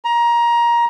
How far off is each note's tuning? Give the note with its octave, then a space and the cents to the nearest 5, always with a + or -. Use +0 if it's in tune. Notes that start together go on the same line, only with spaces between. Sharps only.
A#5 +20